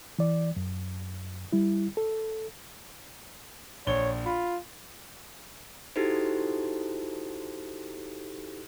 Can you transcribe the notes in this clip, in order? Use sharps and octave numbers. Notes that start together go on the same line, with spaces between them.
E3 D5
F#2
G3 E4
A4
A#1 C#5 G7
F4 B5
D#4 E4 F#4 G4 A4 C5